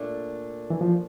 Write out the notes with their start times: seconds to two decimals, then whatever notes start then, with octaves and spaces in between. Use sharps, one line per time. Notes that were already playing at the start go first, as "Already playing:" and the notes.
Already playing: A#2 A3 D4
0.70 E3
0.81 F3